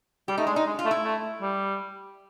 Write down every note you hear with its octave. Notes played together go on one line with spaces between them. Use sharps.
G3 G4
A3 D#4
G#3 D4
D#4
G#3
F4
A3
E4
A3
G3